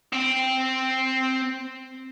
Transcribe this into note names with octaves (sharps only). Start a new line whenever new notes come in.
C4 G5